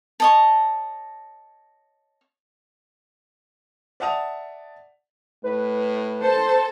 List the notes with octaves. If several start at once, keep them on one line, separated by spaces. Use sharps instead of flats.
C#5 D#5 A5
D5 E5 F#5 A5 D#6 F7
A2 B4
A4 C5 A5